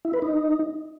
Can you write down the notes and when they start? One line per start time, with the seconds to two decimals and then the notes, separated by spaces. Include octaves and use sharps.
0.05 E4
0.13 B4
0.22 D#4